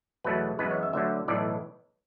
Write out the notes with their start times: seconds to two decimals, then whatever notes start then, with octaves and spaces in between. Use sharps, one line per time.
0.24 E2 B2 F#3 A3 B4
0.59 F#2 E3 G#3 B3 B4
0.71 C#5
0.83 E5
0.93 D2 D3 F#3 E5
1.28 B1 A2 E3 D5